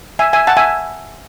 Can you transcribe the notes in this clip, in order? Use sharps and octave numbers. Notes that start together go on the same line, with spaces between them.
E5 G#5
E5 G#5
F#5 A5
E5 G#5